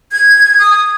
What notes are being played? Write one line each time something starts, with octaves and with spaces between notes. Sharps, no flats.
G#6
D#6